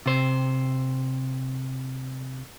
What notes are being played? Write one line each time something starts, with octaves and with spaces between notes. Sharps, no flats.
C3 C5